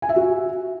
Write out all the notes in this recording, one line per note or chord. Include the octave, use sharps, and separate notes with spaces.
G#5
E5
F#4